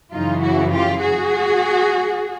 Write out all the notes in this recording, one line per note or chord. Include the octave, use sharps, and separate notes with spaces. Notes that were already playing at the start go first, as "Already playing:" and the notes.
F#2 C#3 E3 D#4 F4
E4 F#4
F4 G4
F#4 G#4